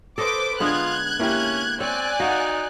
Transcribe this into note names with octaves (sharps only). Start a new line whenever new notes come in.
A4 B4 C5 D#5 D6
D3 G#3 B3 F4 F#6 G#6
A#3 C#4 E4 G4
C4 C#5 D5 G#5 F#6
D#4 F#4 F5 F#5